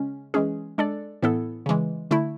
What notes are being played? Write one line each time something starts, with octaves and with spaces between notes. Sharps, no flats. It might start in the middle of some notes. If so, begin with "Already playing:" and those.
Already playing: C#3 G#3 C#4
E3 G#3 C#4 G#4
G#3 D4 A4 D5
A2 E3 B3 E4 A4
C#3 E3 G#3
D3 A3 E4